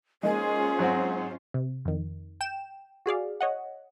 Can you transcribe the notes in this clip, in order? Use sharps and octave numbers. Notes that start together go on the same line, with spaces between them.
G#3 A#3 C#4 D#4 F4 G#4 C5
G#2 F#3 C4 F#4
C3
F2 D#3
G5 E7
F#4 G#4 D5 F5
C#5 D#5 F#5